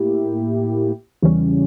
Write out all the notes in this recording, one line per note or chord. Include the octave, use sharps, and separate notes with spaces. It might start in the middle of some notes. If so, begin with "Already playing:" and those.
Already playing: A2 A#3 E4 G4
E2 C#3 E3 G3 C#4